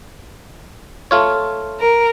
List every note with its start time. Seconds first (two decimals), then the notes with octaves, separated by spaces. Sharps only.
1.11 A3 F4 C#5
1.81 A#4